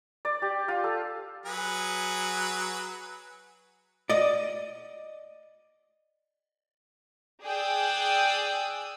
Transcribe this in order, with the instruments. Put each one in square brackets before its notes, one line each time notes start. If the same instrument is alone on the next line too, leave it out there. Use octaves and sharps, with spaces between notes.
[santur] D5
G4
F4
A4
[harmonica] F#3 G#4 B4
[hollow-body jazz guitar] D5 D#5
[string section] G#4 D5 G5 D#6 E6 F#6